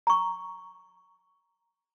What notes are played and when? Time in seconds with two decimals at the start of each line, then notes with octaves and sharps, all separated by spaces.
0.07 A#5 C#6